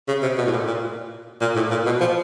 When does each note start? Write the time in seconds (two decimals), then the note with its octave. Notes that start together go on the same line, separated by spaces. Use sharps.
0.08 C#3
0.23 C3
0.38 B2
0.46 A2
0.52 A#2
0.67 A#2
1.41 A#2
1.56 A2
1.71 A#2
1.86 B2
2.01 F3